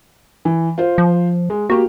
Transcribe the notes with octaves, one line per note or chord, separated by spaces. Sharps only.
E3
F4 C5
F3
G#3
A#3 F#4 G4